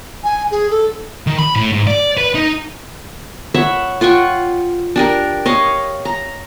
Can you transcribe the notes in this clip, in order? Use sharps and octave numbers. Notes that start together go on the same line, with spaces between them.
G#5
G#4
A4
D#3
B5
A2
G#2
D5
B4
D#4
C#5 E5 F#5 B5
F4 F#5 G5 C#6
D4 G4 A#4
C#5 D#5 F5
A#5